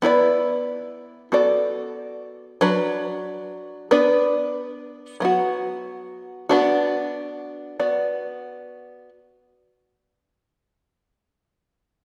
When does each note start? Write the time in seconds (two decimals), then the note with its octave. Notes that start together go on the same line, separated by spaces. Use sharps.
0.02 B3 E4 B4 D5
1.32 B3 F#4 A4 D5
2.61 F#3 D4 B4
3.91 B3 D4 B4 D5
5.20 F#3 B3 F#4
6.49 B3 D4 F#4
7.79 B3 F#4 D5